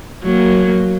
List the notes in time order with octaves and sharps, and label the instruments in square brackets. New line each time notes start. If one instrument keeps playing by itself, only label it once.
[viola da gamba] F#3 A#3